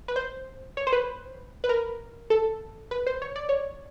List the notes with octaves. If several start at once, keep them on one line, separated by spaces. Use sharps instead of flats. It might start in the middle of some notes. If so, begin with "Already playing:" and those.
B4
C5
C#5
C5
B4
B4
A#4
A4
B4
C5
C#5
D5
C#5